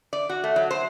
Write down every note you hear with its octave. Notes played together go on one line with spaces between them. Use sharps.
D5
F#4
A3
F#3
C5